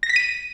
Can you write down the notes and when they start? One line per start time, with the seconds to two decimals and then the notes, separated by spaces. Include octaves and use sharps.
0.03 A#6
0.10 B6
0.16 D#7